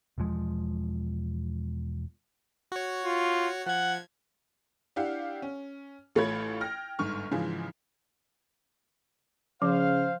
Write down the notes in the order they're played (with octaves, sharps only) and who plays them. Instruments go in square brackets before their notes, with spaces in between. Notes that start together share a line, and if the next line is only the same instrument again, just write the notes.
[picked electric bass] E1 E2 F3 G#3
[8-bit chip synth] F#4 C#5
[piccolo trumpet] F4
[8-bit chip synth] F3 G#6 [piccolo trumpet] F#5
[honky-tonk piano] D4 E4 G4 F5 F#5
C#4
A1 A3 F4 C#5 B5 G#6
G5 F6 A#6
G1 G#2 C#6 F6
G#2 C#3 E3 F3
[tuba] C#3 [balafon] F3 [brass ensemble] C5 F5